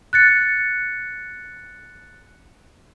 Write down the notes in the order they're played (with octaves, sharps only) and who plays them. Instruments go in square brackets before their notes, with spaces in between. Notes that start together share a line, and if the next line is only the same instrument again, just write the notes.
[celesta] F#6 A6 C#7